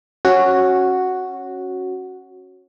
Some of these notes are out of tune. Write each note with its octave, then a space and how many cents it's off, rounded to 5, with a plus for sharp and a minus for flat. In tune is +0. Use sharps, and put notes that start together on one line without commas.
C#4 -15 F#4 +0